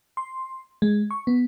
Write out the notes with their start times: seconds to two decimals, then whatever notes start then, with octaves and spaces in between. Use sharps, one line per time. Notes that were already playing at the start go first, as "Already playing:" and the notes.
0.17 C6
0.82 G#3
1.11 C#6
1.27 B3